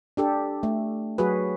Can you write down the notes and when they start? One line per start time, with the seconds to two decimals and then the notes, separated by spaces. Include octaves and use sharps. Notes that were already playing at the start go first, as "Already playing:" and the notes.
0.17 D4 G4 A4
0.63 A3
1.18 F#3 F#4 G#4 B4